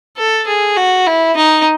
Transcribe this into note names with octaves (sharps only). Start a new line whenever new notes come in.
A4
G#4
F#4
E4
D#4